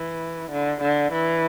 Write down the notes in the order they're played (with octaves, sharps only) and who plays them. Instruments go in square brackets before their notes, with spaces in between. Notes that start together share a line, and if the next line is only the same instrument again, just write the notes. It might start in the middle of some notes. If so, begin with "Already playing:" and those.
Already playing: [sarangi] E3
D3
D3
E3